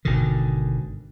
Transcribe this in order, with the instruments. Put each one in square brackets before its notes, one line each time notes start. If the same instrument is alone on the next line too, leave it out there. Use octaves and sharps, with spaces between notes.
[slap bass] G#1 B2 D3 D#3